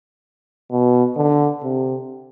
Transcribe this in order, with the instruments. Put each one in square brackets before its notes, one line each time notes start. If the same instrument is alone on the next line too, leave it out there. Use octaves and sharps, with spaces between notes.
[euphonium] B2
D3
C3